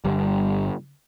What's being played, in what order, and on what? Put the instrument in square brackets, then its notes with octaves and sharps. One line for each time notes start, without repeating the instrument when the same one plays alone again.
[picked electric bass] G1 G3